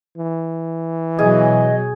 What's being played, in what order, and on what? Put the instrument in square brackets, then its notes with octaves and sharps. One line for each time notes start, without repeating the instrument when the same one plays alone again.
[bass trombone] E3
[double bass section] B2 F#3 [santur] G#4 [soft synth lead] D#5